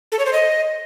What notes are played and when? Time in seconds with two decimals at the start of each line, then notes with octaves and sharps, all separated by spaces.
0.12 A4
0.19 C#5
0.26 C5
0.33 D#5